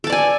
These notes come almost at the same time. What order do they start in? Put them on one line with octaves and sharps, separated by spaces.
A4 A5 D5 G#5